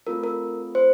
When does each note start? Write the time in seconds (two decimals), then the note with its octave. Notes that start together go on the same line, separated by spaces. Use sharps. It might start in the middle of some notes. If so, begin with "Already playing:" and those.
0.06 A3 C4 F4 A4 A#4
0.23 A#4
0.75 C5